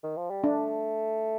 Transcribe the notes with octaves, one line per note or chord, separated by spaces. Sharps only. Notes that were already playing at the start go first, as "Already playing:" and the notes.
D#3
F3
G3
A3 D4